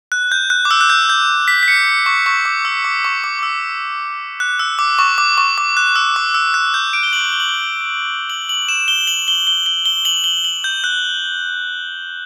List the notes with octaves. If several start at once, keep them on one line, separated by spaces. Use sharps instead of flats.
F#6
G6
F#6
D6
E6
F#6
G6
G6
B6
B6
C#7
C#6
C#6
D6
E6
D6
C#6
D6
D6
E6
F#6
E6
D6
C#6
D6
C#6
D6
F#6
E6
D6
E6
F#6
G6
D7
G7
F#7
G7
F#7
G7
F#7
F#7
E7
G7
F#7
G7
G7
G7
G7
F#7
G7
F#7
G6
F#6